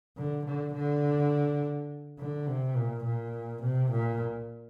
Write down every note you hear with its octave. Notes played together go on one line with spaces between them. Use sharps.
D3
D3
D3
D3
C3
A#2
A#2
C3
A#2